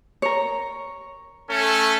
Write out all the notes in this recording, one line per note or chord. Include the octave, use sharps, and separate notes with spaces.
A#4 C#5
A3 C#4 A4